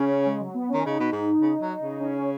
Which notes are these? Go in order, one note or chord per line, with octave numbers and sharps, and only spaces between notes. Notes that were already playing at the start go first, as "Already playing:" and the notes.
Already playing: C#3 C#4
G#3
F#3
B3
D#3 C#4
C#3 D#4
B2
G#2
C#3
F#3
C#3
C#4